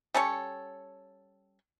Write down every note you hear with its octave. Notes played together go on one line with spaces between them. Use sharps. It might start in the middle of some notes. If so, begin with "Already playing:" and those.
G3 C#4 A4 C#5